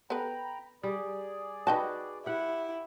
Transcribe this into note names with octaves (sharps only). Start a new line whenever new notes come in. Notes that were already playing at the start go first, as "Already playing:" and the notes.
B3 A4 B4 G5 A#5 B5
G3 G#4 D5
D#4 F#4 B4 G5 A5
E4 G4 F#5